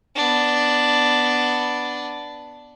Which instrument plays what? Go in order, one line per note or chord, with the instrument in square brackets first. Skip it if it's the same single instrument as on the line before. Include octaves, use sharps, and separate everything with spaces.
[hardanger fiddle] B3 D4